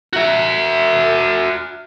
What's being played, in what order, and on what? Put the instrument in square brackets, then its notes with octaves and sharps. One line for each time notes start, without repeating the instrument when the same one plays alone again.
[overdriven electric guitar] F#4 E5